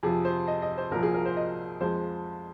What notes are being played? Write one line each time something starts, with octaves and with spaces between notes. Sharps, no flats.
F2 C3 F3 G#4
C5
D#5
D#5
C5
C2 A#2 F3 A#4
G#4
A#4
C5
D#5
F2 F3 G#3 C5